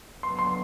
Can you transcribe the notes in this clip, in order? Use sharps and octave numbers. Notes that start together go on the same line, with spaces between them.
D3 F#3 B3 C6
C6